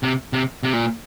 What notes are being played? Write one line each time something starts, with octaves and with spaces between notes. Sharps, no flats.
C3
C3
C3
A#2